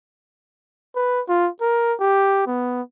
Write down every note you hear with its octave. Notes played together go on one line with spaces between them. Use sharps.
B4
F4
A#4
G4
B3